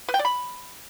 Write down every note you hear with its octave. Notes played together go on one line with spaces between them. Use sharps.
B4
G5
D5
B5